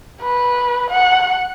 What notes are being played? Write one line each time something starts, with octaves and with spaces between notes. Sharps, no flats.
B4
F#5